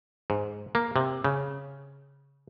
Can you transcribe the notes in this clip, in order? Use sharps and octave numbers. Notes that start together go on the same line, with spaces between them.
G#2
A#3
C3
C#3